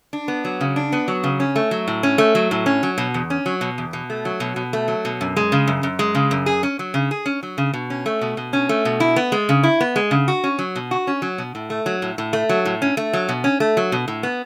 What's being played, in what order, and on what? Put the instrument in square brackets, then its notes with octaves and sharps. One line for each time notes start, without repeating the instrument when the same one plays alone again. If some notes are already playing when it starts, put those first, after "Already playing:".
[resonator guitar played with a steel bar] D4
B3
F#3
C#3
D4
B3
F#3
C#3
C#4
A3
F#3
A2
C#4
A3
F#3
A2
C#4
F#3
B2
E2
C#4
F#3
B2
E2
B2
A3
F#3
B2
B2
A3
F#3
B2
F#2
G#3
C#3
F#2
F#2
G#3
C#3
F#2
G#4
C#4
F#3
C#3
G#4
C#4
F#3
C#3
B2
C#4
A3
B2
B2
C#4
A3
B2
E4
B3
G#3
C#3
E4
B3
G#3
C#3
F#4
C#4
F#3
B2
F#4
C#4
F#3
B2
A2
A3
F#3
A2
A2
A3
F#3
A2
C#4
A3
F#3
B2
C#4
A3
F#3
B2
A2
B3